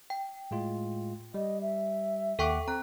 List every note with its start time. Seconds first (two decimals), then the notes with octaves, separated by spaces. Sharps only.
0.10 G5
0.51 A2 G#3 F4
1.34 G3 D#5
1.61 E5
2.39 D#2 A4 F#5 G5 C#6 D6
2.68 C4 A#5 F#6